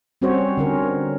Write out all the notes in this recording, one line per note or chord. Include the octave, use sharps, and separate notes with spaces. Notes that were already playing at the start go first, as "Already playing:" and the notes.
G3 C4 C#4 F#4 C5 C#5
D3 C#4 A#4